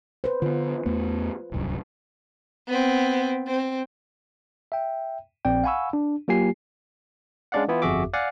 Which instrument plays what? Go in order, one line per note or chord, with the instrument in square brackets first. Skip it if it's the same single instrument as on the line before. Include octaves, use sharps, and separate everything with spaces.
[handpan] B4 C5
[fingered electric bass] D3 B3 [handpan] F4
[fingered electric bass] E2 A3 B3
D1 C2 F#2
[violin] B3 C4
C4
[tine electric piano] E5 G5
A#1 C4 D5 G5
F5 F#5 G#5 B5 C#6 E6
D4
F#3 A#3 F4 G4 G#5 C7
G#3 C#4 D4 D5 F5 F#5
E3 B3 E4 F4
G1 F2 F#4 G#4 E5 D6
D5 F5 F#5 G#5